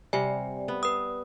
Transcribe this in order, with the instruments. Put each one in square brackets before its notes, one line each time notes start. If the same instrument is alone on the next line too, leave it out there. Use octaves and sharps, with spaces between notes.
[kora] C3 G3 [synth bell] D5 [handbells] G#5
[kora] B3
[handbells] B4 D#6